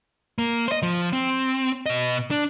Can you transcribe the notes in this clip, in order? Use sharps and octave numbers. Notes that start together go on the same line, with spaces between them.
A#3
C5 D#5
F3
C4
B2 D#5
D4